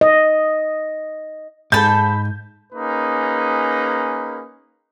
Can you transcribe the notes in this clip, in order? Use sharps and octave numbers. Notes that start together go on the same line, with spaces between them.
D#5
G#2 G#4 A4 A5 B5 G6
A#3 C#4 D#4 G#4 B4